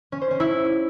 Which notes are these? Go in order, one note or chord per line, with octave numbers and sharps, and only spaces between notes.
C#4
C5
C#4
E4